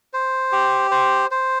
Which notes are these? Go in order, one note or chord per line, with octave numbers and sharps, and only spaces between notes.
C5
G4
C5
C5